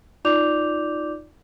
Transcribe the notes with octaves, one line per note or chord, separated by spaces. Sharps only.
D#4 F4 D5 D6 G6 F7